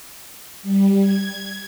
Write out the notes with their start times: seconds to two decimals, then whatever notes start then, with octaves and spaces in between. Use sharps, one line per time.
0.63 G3
1.01 G#6